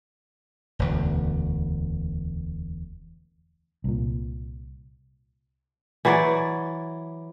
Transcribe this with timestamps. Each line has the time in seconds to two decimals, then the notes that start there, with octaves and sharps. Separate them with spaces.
0.79 E1 D2
3.84 C2 A#2
6.05 E3 F#3 C5 D5